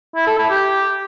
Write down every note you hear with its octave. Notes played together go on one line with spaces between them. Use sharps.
E4
A4
E4
G4